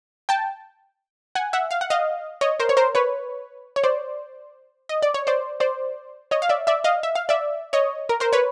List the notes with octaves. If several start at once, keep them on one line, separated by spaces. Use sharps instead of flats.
G5 A5
F#5 G#5
E5 F#5
F5
F#5
D#5 F5
C#5 D#5
A#4 C5
C#5
A#4 C5
B4 C#5
C#5
C5 D5
D#5
D5
C#5
C5 D5
C5 D5
C#5 D#5
F5
D5 E5
D5 E5
D#5 F5
E5
F5
D5 E5
C#5 D#5
A#4
A#4 C5
B4 C#5